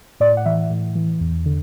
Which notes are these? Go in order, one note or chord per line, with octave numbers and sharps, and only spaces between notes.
A2 D5
F#5
E3 E5
A2
E3
E2
D3